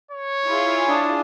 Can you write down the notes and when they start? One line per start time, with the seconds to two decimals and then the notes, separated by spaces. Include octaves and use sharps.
0.11 C#5
0.46 E4 F4 G#4
0.88 D4 A5 D#6